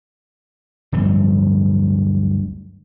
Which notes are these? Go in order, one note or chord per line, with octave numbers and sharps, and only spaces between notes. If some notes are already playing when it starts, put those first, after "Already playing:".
D1 G2 F3